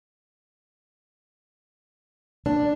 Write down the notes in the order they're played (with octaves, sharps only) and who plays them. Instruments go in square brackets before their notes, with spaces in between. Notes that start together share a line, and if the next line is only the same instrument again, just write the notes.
[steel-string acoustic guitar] D4